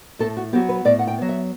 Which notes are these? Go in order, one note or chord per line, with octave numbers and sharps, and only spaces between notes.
A2 A4
F#4
F#3 B3 G4
B4
A2 D5
F#5
G5
F#3 B3
E5